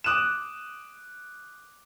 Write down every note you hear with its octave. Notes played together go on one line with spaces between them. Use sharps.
D6 D#6 F#6 D#7 E7